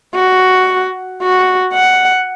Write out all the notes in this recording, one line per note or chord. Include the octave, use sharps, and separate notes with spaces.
F#4
F#4
F#5